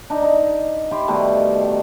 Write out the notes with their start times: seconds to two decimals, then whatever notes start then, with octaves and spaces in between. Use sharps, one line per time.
0.10 D4 D#4 A#5
0.22 D#4 A#5
0.91 E4 G4 C6
1.08 B2 D#3 G3 A3